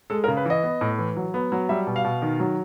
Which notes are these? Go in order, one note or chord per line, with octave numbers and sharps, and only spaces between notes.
G#3 A4
A#4
C#3
B4
E3 D#5
B3
A2
E3
F#3
B3
F#3
G3 E5
B2
F5
B2
D#3
F#3